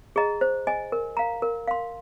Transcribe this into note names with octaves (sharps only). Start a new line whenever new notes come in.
G#4 D#5 A#5
C5
D#5 G#5
A#4
F5 A#5
A#4
F5 C6